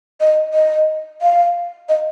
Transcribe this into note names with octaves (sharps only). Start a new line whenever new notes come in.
D#5
D#5
F5
D#5